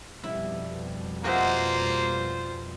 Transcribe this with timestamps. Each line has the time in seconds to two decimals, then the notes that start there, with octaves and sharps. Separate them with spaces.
0.24 F2 B2 G3 E4
1.24 A#3 F4 F#4 C5 D#5 E5